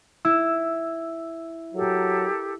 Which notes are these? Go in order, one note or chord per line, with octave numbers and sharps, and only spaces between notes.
E4 E6
F#3 G4 A4 A#4